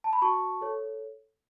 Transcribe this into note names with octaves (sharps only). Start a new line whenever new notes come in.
A5
B5
F#4 A5 C#6
A4 C#5